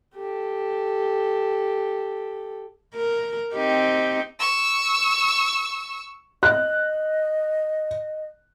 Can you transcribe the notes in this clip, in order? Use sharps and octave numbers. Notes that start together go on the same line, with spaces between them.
G4 A4
A#4
C4 D#4 G4
C#6 E6
D#5 F#6